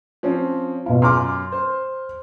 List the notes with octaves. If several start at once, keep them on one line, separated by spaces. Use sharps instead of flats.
F3 C4 C#4
B2 F4
F#2 C6 D6 F6
C5